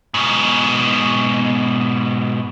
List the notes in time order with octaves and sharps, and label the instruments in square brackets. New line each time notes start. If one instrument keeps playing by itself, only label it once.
[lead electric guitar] G#2 B2